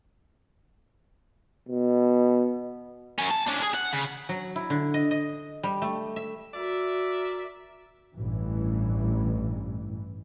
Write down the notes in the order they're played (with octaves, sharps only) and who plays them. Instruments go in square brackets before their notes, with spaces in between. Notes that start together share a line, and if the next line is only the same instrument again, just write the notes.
[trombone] B2
[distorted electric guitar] F#2 C#4
A5
C#4 D4
G#4
F#5
C#3
[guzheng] F#3
E4
D3
D#5
D#5
G3
A3
E5
[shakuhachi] F#4 [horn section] A#4 D5 E5
[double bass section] A1 G2 E3